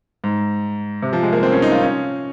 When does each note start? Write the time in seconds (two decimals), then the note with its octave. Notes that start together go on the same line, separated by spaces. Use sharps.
0.24 G#2
1.02 C3
1.13 F3
1.23 G#3
1.33 A#3
1.43 C4
1.52 C#4
1.62 D#4
1.72 F4
1.82 C#4